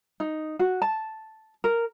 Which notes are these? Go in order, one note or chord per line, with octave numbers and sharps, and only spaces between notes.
D#4
F#4
A5
A#4